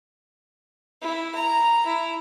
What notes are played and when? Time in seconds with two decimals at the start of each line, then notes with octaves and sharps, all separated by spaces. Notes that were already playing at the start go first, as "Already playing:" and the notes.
1.02 E4
1.35 A#5
1.86 E4